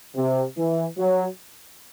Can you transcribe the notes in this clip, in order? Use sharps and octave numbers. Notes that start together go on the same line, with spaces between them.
C3
E3
F#3